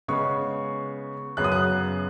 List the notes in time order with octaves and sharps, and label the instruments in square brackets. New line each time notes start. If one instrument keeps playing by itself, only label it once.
[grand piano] C#3 G#3 B3 C#6
F#2 C#3 B3 F#6
D#6
F#6